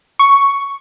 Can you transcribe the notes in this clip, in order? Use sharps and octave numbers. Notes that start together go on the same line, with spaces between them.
C#6